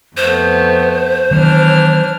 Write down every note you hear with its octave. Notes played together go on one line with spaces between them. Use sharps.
F2 A3 B3 C5
D#3 E3 F#3 B3 D4 F6